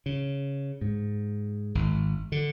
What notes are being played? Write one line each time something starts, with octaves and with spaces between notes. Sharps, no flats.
C#3
G#2
G#1
D3